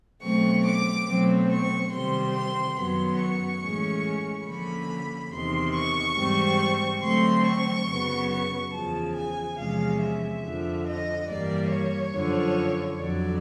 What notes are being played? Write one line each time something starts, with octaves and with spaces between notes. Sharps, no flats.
B2 F#3 A3 C4 C#6
D6
B2 F#3 A3 C4
C#6
C3 D#3 G3 C4 C6
C6
F#2 D#3 F#3 B3 C6
C#6
A2 E3 G#3 C#4
D3 F3 A#3 C#4 B5
E2 C3 D#3 C6
C#6
G#2 E3 G3 C4
D3 F#3 A3 C4 C6
C#6
F#2 C#3 F#3 B3
C#6
E2 C#3 F3 A5
G#5
E2 C3 F3 G#3 C#4 F5
E5
F2 D3 F3
D#5
G2 E3 G3 A#3 D5
C#5
F#2 D3 F3
F2 D3 F#3 D5